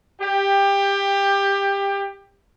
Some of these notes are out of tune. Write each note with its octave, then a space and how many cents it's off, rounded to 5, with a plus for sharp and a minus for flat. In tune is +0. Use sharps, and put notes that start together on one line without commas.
G4 +20